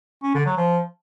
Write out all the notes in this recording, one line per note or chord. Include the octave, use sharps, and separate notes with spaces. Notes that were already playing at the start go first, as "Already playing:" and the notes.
C#4
D3
F#3
F3